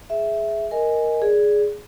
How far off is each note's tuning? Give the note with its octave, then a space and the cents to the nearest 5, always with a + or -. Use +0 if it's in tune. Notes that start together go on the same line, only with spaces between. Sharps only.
G#4 +10 E5 +0
A#4 +0 D#5 +0 G#5 +0
G#4 +0 D5 -15